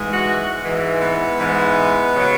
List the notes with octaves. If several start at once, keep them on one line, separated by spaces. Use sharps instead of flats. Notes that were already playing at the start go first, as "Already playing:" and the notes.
Already playing: G#2 E3 G#3
F#4
G#2 E3 G#3
B3
G#2 E3 G#3
C#3 F#3